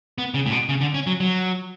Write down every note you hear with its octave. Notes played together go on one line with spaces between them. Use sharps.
B3
C#3
A2
B2
C#3
D3
C#4
F#3
F#3